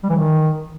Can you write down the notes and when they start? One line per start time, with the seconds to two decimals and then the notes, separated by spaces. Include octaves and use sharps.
0.03 G3
0.09 E3
0.15 D#3